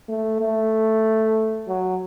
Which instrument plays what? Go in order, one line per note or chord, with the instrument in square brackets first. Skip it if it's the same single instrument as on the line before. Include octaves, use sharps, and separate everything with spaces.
[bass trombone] A3
A3
F#3